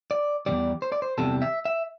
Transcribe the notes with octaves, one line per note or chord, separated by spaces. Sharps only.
D5
E2 C3 G3 D5
C5
D5
C5
E2 C3 G3 A4
E5
E5